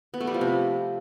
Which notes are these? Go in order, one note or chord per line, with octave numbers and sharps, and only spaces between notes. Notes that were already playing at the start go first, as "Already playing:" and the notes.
B3
A3
G3
F3
C3